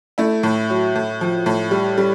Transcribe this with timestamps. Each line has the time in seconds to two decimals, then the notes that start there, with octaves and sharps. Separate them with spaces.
0.18 A3 E4
0.43 A2
0.70 F#3
0.95 A2
1.21 F3
1.46 A2
1.71 G3
1.97 G3